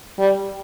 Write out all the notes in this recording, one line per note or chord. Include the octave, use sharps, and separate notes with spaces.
G3